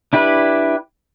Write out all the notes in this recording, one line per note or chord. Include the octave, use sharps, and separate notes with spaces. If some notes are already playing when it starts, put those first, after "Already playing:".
D4 E4 G4 B4